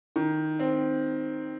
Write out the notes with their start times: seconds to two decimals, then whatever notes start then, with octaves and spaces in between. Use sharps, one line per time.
0.16 D#3
0.59 C4